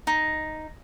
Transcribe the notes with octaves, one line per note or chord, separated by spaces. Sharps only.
D#4